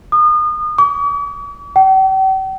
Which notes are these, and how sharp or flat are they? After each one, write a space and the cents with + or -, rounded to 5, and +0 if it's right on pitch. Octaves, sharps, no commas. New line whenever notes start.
D#6 -35
D6 -45
G5 -45